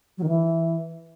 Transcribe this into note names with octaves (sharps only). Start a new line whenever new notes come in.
F#3
D#3
E3